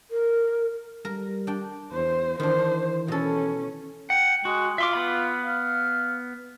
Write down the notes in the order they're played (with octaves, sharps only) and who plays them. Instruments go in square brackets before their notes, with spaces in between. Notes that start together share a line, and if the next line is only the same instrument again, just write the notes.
[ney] A#4
[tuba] G3 [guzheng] A#4
[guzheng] D4 G5
[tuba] E2 [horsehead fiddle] C5
[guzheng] D#3 D4 [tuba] E3 [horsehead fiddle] C5
[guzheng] B2 A4 [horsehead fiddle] C#4
[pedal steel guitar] F#5 [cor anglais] G5
[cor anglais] G#3 [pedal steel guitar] F#4
[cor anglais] F4 [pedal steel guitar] E5 C6 D6
[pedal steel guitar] B3 B5
[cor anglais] F5